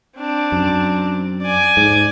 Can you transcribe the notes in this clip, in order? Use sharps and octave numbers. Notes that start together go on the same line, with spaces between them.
C4 D4
F#2
D5 G#5
G#2